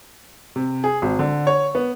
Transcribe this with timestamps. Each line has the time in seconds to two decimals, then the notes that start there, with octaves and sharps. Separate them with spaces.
0.56 C3
0.84 G#4
1.02 G#1
1.19 D3
1.47 C#5
1.75 B3